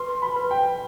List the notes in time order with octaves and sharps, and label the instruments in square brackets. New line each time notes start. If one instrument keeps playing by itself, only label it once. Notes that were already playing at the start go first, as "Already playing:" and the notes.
Already playing: [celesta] B4 [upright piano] C6
[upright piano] B5
[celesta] B4
[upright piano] G5